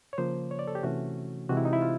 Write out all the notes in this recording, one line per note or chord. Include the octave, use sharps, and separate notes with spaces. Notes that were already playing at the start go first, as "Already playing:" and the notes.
C#5
C#3 F3 A#3 C5
C#5
D5
A4
G4
C3 E3 A3 C#4 F#4
C3 E3 G#3 F#4
E4
D#4
E4
F4